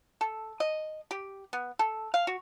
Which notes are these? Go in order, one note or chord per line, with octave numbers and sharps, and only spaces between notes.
A4
D#5
G4
B3
A4
F5
F#4